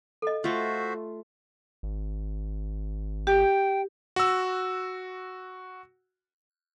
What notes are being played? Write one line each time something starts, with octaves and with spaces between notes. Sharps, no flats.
A4 D#5
A3 F4 F#4 C5 E5
G#1
G4 G5
F#4 E6